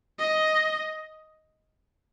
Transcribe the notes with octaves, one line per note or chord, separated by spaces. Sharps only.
D#5